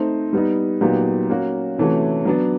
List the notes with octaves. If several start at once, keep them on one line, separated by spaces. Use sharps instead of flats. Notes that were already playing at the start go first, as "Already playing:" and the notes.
Already playing: A3 C4 D#4
G3 B3 D#4
A#2 F#3 B3 D#4 G4
A#3 C#4 F#4
C3 E3 A3 C#4 F#4
F#3 B3 D4